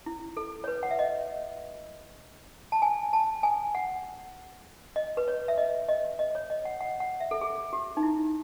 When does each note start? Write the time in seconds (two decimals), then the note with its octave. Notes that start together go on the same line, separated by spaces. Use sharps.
0.06 E4
0.37 A4
0.64 C#5
0.68 B4
0.83 F#5
0.91 E5
0.99 D#5
2.72 A5
2.82 G#5
3.13 A5
3.43 G#5
3.75 F#5
4.96 D#5
5.17 B4
5.28 C#5
5.48 E5
5.58 D#5
5.88 D#5
6.19 D#5
6.35 C#5
6.50 D#5
6.65 F#5
6.81 F#5
7.00 F#5
7.20 E5
7.31 A4
7.41 G#4
7.73 F#4
7.97 D#4
8.03 E4